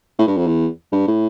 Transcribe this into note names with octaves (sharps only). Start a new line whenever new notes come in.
A2
G2
F2
E2
G2
A2